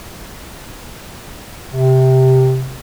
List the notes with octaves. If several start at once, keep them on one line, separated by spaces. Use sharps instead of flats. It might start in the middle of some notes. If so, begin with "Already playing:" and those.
C3